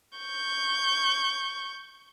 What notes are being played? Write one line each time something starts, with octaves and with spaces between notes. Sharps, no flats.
C#6 G6